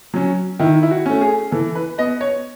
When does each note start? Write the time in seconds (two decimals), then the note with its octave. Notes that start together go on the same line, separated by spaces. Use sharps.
0.14 F#3 C#4
0.59 D#3 E4
0.83 E4
0.91 F#4
1.06 A3 C#4
1.21 G#4
1.51 E3 A4
1.75 B4
1.98 B3 D#5
2.21 C#5